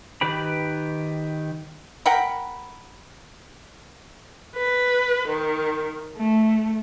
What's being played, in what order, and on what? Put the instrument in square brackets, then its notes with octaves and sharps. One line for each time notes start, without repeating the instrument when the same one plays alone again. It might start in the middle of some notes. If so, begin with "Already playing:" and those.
[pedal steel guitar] D#3 G4 B4 G5 B5
[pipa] A#4 F#5 G5 B5
[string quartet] B4
D#3
A3